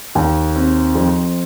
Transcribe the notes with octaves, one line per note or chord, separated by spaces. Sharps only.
D#2
C4
F2